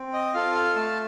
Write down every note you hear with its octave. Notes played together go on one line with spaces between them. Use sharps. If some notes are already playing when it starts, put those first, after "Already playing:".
Already playing: C4
D#5
F4 A4 F5
F5
A3 A5